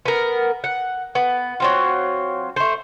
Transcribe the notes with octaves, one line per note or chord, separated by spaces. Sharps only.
B3 A#4
F#5
B3
F#3 C4 F4
A3 C5